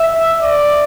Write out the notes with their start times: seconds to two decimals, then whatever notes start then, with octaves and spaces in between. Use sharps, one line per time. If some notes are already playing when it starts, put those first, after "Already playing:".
Already playing: E5
0.41 D5